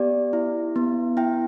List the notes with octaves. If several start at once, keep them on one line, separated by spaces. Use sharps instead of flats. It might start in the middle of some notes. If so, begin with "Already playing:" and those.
Already playing: B3 G4 D5
E4
B3
E4 G5